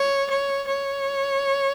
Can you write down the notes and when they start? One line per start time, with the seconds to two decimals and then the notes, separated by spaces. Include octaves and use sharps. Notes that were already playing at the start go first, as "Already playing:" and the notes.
Already playing: C#5
0.30 C#5
0.67 C#5